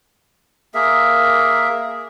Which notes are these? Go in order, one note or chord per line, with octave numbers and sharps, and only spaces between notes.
A#3 G#4 A#4 E5